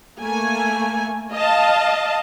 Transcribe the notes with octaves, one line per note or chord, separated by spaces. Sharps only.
A3 A#3 G#5
D#5 F5 A5